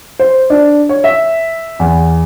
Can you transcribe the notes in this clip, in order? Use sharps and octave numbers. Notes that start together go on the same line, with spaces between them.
C5
D4
C#5
E5
E2